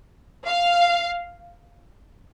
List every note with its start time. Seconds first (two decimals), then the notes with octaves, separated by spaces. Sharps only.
0.47 F5